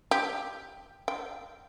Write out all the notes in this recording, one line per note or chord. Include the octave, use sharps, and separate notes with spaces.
G4
G5